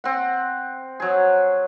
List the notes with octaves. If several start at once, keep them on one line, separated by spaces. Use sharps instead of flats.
C4 F#5
F#3 G#4